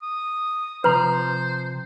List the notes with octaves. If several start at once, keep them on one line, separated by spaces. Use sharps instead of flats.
D#6
C3 F3 B4 C5 A#5